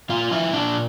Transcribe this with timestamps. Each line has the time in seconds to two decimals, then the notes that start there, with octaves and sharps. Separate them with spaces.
0.09 A#2 F4 F5
0.31 F3 E4 E5
0.53 A#2 D4 D5